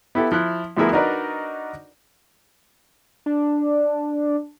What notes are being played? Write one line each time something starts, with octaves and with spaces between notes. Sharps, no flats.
B3 E4 G4 A4
F3 E4 F#6
D2 F3 B3 E4 G#4 A#4
D4 D#4 F#4 A#4 B4 D5
D4